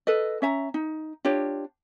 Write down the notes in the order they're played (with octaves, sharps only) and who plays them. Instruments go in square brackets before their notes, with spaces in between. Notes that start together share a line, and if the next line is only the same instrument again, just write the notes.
[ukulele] A4 B4 D#5
C#4 E5 A#5
D#4
D4 F4 G4 C#5